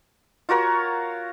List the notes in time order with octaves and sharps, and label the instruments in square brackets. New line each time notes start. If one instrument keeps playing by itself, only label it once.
[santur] F4 F#4 A#4 C#5